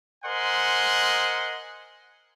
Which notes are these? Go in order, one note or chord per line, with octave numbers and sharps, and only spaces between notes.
A#4 C5 D#5 F#5 G#5 C6